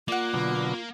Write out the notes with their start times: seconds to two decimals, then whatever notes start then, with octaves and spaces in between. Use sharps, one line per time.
0.08 A#3 F4 D5 F#5
0.34 B2 D3 F#3 A#3